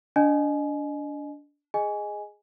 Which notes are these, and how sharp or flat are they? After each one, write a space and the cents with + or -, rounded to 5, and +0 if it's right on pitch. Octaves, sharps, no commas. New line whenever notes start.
D4 -20 D#5 -25 G#5 +25
G#4 +0 D#5 +0 G#5 +0